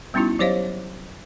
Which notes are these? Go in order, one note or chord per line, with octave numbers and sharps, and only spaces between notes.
G3 B3 C#4 D#4 E4 F#4
F#3 G4 C5 C#5 D#5 F5